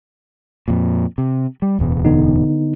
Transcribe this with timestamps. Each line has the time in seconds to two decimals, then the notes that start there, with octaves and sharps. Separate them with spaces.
0.68 F2 A#2
1.18 C3
1.62 G3
1.79 D1 E2 B2
2.05 D3 B3 D#4